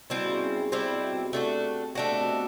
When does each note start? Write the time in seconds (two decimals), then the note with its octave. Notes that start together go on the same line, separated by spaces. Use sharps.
0.10 B2 G3 C4 E4
0.25 C#3
0.41 C#3
0.56 C3
0.72 C3 G3 C4 E4
0.92 B2
1.12 C3
1.33 A3 D4 F#4
1.95 C3 A3 D4 F#4
2.10 B2
2.21 C3
2.26 B2